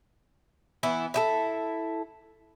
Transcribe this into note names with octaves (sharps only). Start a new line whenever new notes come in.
E3 B3 E4
E4 G4 A4